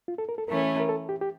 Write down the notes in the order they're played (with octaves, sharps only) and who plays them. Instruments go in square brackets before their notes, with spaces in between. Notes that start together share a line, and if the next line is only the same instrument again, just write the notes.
[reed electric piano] F4
A4
A#4
A4
[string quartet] E3 A3 C#4 [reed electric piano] A#4
[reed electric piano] A#4
A4
G4
G4